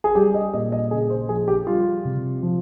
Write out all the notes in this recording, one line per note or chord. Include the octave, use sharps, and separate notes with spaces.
G#4
G3 G4
D#5
A#2 D#5
D#5
C#3 G#4
C5
F3 G#4
G4
G3 F4
C3
F3